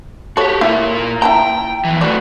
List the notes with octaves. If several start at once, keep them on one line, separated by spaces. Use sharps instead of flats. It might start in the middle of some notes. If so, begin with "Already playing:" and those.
F#4 G4 A4 C#5
A#3 E4 F4 A#4
E4 G5 A5 A#5
F2 E3
A3 F#4 B4 D5